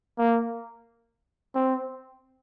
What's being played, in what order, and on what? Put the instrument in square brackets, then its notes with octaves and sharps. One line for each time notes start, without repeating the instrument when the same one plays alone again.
[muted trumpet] A#3
C4